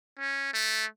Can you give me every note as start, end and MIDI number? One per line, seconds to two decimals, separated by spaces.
0.19 0.52 61
0.54 0.85 57